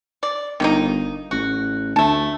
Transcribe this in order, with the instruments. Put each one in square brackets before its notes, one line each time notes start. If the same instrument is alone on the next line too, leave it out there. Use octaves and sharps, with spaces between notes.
[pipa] D5
[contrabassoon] G1 [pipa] D#3 A#3 D#4
[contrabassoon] A1 [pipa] F#4
[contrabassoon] D2 [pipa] A3 A5